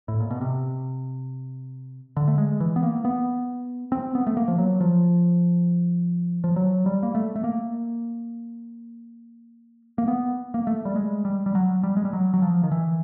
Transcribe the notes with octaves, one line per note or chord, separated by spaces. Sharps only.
A2
A#2
B2
C3
D3
A3
G#3
E3
B3
A#3
B3
C4
B3
A3
A#3
F3
F#3
F3
F3
F#3
G3
A#3
A3
A3
A#3
A#3
B3
A#3
A3
G3
G#3
G3
G3
F#3
G3
G#3
G3
F#3
F#3
F3
D#3
E3